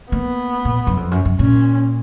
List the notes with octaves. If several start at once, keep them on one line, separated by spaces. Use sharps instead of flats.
A#3 B3
A#2
F#2
F2
F#2
F#2
A#2 C#4